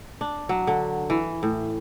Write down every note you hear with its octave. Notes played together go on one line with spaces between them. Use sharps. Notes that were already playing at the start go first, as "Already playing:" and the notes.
D4
F#3
D3
E3
A2